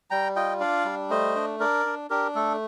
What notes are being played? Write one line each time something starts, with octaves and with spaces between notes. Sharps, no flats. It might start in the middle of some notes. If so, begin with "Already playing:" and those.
G3 G5 A#5
F4 D#5 G5
D4 D5 F5
G3
A3 C5 D#5
D4
D4 A#4 D5
D4
D4 G4 A#4
A3 A4